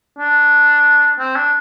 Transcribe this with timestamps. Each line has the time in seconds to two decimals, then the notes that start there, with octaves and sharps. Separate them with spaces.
0.19 D4
1.19 C4
1.36 D4